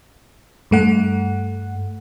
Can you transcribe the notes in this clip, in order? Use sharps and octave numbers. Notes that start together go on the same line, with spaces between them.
G2 A3 F#5